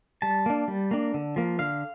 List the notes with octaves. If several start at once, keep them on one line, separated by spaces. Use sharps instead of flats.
G3 A5
A#3 D4
G3
A#3 D4
D3
F3 A#3
D3 F5